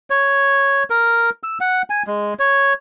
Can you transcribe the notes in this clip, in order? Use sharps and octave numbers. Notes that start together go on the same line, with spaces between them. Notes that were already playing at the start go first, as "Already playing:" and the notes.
C#5
A#4
E6
F#5
G#5
G#3
C#5